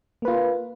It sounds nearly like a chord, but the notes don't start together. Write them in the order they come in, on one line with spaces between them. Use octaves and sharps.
A#3 B4 F4